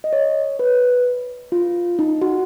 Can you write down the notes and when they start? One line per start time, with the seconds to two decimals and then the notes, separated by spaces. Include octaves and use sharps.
0.04 D#5
0.13 C#5
0.59 B4
1.52 F4
1.99 D#4
2.22 F#4